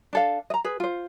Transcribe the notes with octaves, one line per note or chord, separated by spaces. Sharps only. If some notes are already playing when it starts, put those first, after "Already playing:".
D4 A4 F5
D#5 A#5
G#4 B4
F4 C5